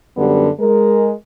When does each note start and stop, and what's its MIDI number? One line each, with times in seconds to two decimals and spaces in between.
0.17 0.49 42
0.17 0.49 50
0.17 0.49 55
0.17 0.49 59
0.60 1.12 56
0.60 1.12 70